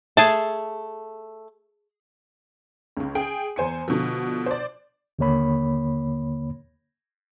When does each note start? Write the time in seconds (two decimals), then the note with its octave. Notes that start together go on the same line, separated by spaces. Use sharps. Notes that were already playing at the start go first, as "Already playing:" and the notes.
0.17 A3 G#4 A5
2.97 C#2 C#3
3.15 G#4 G5
3.56 E2 C5 G#5 C#7
3.88 B2 D3 F3
4.46 C5 D5
5.19 D#2 D3 A#3 C#5 B5